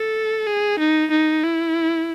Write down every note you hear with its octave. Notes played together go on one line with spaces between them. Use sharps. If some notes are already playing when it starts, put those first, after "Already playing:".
Already playing: A4
G#4
D#4
D#4
E4